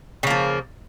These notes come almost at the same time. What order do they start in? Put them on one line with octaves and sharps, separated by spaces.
C#3 A#3 F3